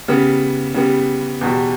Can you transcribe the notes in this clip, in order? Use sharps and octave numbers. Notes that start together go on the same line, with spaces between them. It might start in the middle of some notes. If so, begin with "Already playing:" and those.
C#3 G3 B3
C#3 G3 B3
E2 B2 G3